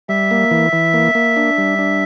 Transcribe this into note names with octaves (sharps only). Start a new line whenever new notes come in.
G3 E5
A#3
E3
E3
A#3
A#3
D4
G3
D4